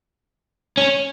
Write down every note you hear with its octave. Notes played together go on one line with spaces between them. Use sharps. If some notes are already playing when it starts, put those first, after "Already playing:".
C#4